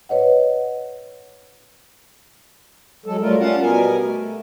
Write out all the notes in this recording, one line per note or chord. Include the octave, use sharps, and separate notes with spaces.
B4 C#5 D#5 F#5
F#3 G#3 A4
F#3 G3 A3 F4 A#4
G3 C#4 F4 F5 F#5 A5
B2 G3 B3 A#4 G#5
A3